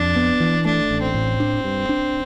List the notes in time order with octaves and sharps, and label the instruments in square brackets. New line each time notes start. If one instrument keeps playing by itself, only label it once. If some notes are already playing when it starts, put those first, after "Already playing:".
Already playing: [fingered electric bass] F2 [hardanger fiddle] D4
[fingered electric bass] B3
E3
[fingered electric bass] A3 [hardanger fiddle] D4
[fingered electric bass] A1
[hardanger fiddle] C4
[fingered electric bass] A2
D4
G2
D4